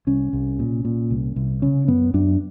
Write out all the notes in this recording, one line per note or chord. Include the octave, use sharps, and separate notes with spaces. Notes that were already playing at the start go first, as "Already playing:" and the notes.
C2 C#4
C2
A#2
A#2
C2
C2
C#3 C#4
F#2 B3
F#2 D4